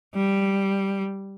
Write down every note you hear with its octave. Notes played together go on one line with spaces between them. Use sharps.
G3